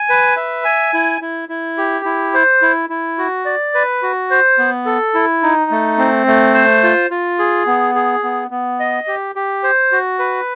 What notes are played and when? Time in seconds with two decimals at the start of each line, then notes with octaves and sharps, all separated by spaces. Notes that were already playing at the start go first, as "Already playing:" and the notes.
Already playing: G#5
0.09 B4
0.36 E5
0.65 G#5
0.94 E4
1.21 E4
1.49 E4
1.78 G4
2.05 E4
2.34 C5
2.62 E4
2.89 E4
3.18 F#4
3.45 D5
3.75 B4
4.03 F#4
4.31 C5
4.58 B3
4.86 A4
5.14 E4
5.43 D#4
5.71 A3
5.98 C4
6.27 A3
6.54 C5
6.83 F4
7.10 F4
7.39 G#4
7.67 B3
7.95 G#4
8.23 B3
8.51 B3
8.80 D#5
9.08 G4
9.35 G4
9.63 C5
9.92 F#4
10.19 B4